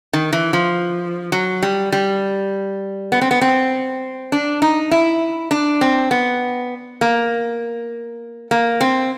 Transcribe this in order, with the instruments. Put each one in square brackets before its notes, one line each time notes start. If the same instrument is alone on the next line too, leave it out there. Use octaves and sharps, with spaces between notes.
[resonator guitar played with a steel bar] D#3
E3
F3
F#3
G3
G3
B3
C4
B3
C4
D4
D#4
E4
D4
C4
B3
A#3
A#3
C4